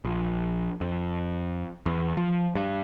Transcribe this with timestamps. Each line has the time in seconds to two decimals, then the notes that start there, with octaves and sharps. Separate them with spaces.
0.05 A#1
0.81 F2
1.86 E2
2.17 F3
2.55 G2